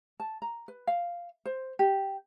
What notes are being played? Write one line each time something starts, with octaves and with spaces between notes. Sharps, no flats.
A5
A#5
B4
F5
C5
G4